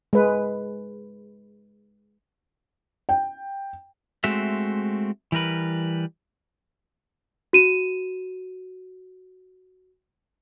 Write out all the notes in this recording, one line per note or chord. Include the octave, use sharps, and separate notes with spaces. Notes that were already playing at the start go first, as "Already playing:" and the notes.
G#3 B4
G5
G#3 A3 C4 F#4 E5
E3 G3 A#4 B4
F#4 D#7 E7